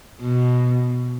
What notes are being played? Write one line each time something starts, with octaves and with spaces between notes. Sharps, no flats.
B2